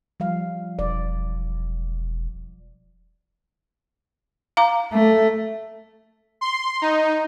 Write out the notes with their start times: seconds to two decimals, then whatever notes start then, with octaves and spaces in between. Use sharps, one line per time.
0.20 F3 G3 F5
0.79 E1 D5
4.57 F5 A#5 D6
4.93 A3
6.41 C6
6.82 D#4